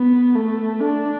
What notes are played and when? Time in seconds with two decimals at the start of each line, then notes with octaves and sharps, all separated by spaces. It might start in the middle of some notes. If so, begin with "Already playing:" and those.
Already playing: B3
0.36 A3
0.81 D4